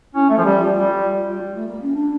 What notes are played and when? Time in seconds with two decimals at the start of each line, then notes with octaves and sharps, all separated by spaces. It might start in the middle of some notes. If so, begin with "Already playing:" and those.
0.14 C#4 E4
0.30 A3 A4
0.38 F3
0.44 G3 G4
0.59 F4
0.75 G3 F4
1.41 G3
1.54 A3
1.67 A#3
1.81 C#4
1.94 D4